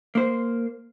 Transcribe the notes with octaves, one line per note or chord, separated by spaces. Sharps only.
A#3 C5